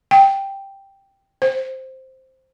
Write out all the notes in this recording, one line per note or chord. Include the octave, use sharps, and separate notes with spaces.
G5
C5